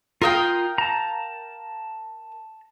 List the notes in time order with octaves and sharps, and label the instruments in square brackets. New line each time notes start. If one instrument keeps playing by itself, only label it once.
[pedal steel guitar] F4 D#6 [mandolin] A#4 F5 G5
[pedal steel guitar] A5 A#5